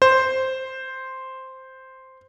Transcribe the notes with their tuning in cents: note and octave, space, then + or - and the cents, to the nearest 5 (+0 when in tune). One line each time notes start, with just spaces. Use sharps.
C5 +0